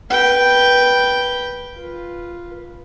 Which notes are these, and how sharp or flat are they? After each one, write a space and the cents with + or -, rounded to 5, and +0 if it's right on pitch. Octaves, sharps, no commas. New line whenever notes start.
B4 -10 G5 +0
F4 -5 B4 -5